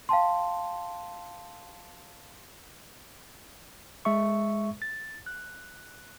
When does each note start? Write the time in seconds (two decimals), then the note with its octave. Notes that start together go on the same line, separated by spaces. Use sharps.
0.09 F5 G5 A5 C6
4.05 G#3 E5 C#6
4.82 A6
5.26 F#6